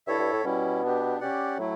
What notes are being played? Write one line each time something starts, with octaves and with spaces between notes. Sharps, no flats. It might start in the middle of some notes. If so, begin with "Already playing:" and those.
G2 E4 A4 C#5 E5
G2
A2
B2 G3 C#4 E4
B3 D4 G4
C#4 G4 D5 F#5
A2 F#3 A3 E4